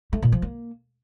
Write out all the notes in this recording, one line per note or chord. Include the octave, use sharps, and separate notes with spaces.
A3
A#2
F3
A#3